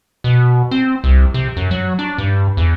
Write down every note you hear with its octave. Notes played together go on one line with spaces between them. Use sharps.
B2
C4
C2
C3
F#2
F#3
D4
G2
E2